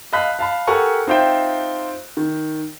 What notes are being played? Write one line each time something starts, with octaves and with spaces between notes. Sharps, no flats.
D#5 F5 A5 B5 F#6 B6
F5 A5 B5
G4 A4 A#4 F#5 G#5 C#6
C4 D#4 F4 C5 E5 G5
D#3